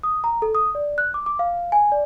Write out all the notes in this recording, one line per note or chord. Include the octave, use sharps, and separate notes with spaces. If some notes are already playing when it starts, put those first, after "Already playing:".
D#6
A#5
A4
D#6
D5
F#6
D6
D6
F5
G#5
D5